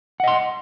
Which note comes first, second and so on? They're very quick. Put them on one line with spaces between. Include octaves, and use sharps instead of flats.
F#5 D#5 C6